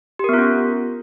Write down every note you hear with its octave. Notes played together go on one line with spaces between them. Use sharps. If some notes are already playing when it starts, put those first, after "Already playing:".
B3 C#4 F4 G4 A#4